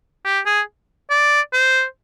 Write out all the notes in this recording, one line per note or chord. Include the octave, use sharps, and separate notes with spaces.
G4
G#4
D5
C5